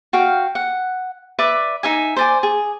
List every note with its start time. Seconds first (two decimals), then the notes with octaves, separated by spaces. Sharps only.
0.13 F#4 F5 G5
0.55 F#5
1.39 B4 D5 E5 B5
1.83 D#4 E5 G#5
2.16 C5 D5 G#5
2.43 G#4